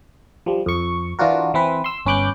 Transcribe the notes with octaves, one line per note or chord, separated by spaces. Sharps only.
F3 G3
F2 C#6
E3 D4 F4 F#4 A#4
E3 C4 B4
C6 E6
G1 C#4 B4 D6 F#6 G6